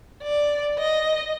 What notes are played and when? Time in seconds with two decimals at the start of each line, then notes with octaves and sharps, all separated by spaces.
0.24 D5
0.78 D#5